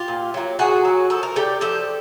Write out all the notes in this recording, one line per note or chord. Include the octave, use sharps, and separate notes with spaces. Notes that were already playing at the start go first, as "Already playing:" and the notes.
Already playing: F4 G4
A#2
F#3 A#3
A#2 F#4 G#4
F#3 A#3
F3 A4
A#4
A3 D4 G4 A4
F3 G4 A4